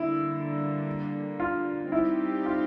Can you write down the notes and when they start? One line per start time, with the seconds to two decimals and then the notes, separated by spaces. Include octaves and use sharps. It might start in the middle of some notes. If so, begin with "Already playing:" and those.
Already playing: D3 G3 A#3 E4
1.40 F4
1.92 G3 C4 D#4 E4 G4
2.46 F4